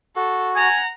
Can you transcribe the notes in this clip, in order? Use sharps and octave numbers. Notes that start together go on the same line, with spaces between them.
F#4 A4
F#5 G#5 A#5